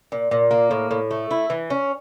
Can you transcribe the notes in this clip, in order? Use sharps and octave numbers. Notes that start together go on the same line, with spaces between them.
A#2
A#2
A#3
A2
A2
A3
E4
E3
C#4